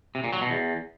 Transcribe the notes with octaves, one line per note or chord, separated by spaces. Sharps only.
C3
A#2
F#3
B2
E2